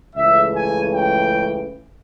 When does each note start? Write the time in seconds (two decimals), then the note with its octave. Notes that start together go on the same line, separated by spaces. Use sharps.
0.16 C#2 C#3 E3 A3 E5
0.54 G#5
0.93 G5